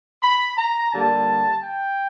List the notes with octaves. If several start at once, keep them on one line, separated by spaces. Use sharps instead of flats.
B5
A#5
D3 G3 A#3 A5
G5